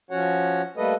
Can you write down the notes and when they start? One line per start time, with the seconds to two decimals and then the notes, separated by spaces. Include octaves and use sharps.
0.11 F3 C#4 F#4 C#5 F#5
0.77 G3 A3 A#3 A4 B4 D#5